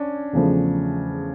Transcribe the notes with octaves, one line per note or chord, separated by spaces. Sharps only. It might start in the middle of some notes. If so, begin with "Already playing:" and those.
Already playing: C#4 D4
E2 C#3 F3 A3